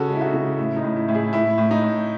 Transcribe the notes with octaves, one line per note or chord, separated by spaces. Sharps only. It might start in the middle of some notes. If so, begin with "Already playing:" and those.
Already playing: C#3 F#4 A4
G#3
E4
D#4 F#4
C#3
A2 E4
D#4
A2
E4
A2
E4 G#4
A2 E4
A2
D#4
A2